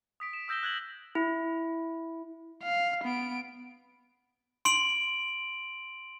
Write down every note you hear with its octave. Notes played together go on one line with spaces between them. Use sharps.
D#6 B6 D7
E7
D#6 E6 G6 A#6 E7 G7
F#6 G#6 F#7
E4
F5
B3 D7
C6 D7 F#7